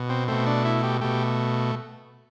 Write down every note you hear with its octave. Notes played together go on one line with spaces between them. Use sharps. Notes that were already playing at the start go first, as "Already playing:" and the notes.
Already playing: B2
C4
B2 A3 C4
D4
E4
G4
B2 A3 G4